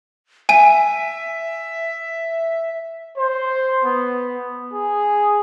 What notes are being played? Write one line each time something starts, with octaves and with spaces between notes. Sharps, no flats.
E5 G#5 D#7
C5
B3
G#4